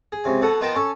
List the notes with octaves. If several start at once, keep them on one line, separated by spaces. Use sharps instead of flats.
G#4
C#2 C3 G#5
B2 A4 F#5
B3 D#4 F4 A#4 G5 A5
C#4 A4